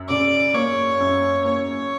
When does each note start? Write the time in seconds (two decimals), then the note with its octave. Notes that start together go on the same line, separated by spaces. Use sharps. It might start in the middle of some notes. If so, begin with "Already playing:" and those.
Already playing: F#2
0.09 C#3 D5
0.54 A#3 C#5
1.00 F#2
1.45 A#3 C#5